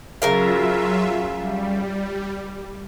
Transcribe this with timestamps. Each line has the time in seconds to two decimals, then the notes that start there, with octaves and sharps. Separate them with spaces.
0.22 C#3 F#3 F4 A#4 E5 F5
1.38 G3